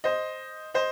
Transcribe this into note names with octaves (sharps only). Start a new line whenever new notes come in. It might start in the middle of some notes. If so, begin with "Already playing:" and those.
C5 D#5
C5 D#5